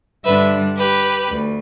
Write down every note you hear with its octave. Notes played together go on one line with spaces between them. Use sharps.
G2 D3 G3 D4 B4 E5
G4 B4
D2